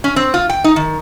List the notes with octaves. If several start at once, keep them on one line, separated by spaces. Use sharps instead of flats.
C#4
C4
F4
G5
D#4
D#3